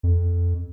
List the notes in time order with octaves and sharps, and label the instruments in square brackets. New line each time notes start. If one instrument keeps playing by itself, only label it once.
[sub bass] F2